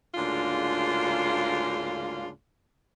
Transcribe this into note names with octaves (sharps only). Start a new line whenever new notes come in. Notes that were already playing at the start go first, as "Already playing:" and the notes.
D2 G#2 C#3 A#3 D4 F4